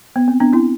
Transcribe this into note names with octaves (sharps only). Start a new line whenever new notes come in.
B3
C4
B3 D4
C4 E4